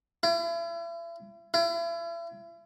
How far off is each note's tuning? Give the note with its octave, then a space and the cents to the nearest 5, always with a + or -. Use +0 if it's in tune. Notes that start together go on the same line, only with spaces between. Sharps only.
E4 +40
E4 +40